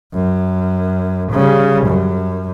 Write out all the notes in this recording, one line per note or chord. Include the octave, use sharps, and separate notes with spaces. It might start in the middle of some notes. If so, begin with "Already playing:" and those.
F#2
C#3 G3
F#2